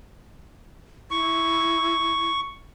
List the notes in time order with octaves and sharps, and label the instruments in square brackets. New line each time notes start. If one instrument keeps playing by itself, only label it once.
[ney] E4 [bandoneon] C#6